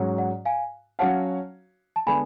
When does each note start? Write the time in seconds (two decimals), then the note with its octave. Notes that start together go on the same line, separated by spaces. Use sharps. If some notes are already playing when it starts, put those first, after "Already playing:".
Already playing: G#2 F#3 C#4 F#4 C#5
0.18 D5 F#5
0.45 F5 G#5
0.99 F#3 C#4 F#4 C#5 F5 F#5 A5
1.96 A5
2.06 D3 G#3 B3 D4 G#5 B5